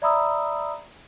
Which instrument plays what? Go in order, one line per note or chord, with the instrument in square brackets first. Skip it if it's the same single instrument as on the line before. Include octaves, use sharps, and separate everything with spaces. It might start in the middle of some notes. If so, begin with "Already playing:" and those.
[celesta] D5 E5 A#5 B5 D#6 E6